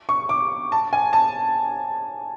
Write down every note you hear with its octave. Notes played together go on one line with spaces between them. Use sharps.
C#6
D6
A5
G#5
A5